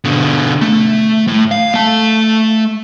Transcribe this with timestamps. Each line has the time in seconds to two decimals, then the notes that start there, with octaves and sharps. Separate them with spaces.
0.05 B2 D3
0.61 A3
1.28 A2
1.51 F5
1.74 A3 A5